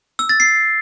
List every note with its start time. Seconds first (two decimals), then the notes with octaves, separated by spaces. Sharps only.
0.19 E6
0.29 A6
0.40 C7